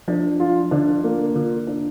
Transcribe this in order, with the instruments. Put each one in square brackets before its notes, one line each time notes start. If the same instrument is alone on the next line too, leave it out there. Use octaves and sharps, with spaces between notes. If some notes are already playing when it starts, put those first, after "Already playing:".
[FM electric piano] F3 [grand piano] D4
[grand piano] F4
[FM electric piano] D3 [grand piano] D4
[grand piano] A#3
[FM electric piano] D3 [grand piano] F4
[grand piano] D4